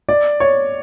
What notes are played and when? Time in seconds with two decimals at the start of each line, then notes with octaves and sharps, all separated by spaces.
0.09 D5
0.40 C#5